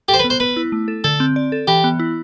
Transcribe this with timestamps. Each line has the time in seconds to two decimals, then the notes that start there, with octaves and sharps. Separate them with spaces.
0.08 G4 A4
0.14 C5
0.19 B4
0.24 B3
0.30 C5
0.40 B3 B4
0.56 E4
0.72 A3
0.88 A4
1.04 D3 A4
1.20 C4
1.36 D5
1.52 A4
1.68 E3 G4
1.84 B3
2.00 E4